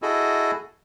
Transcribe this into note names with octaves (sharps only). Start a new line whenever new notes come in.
E4 F#4 G#4 A4 D#5